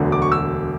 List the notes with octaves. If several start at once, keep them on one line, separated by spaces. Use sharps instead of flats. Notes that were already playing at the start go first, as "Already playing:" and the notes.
Already playing: E1 D2 D3 F#3
D6
C#6
E6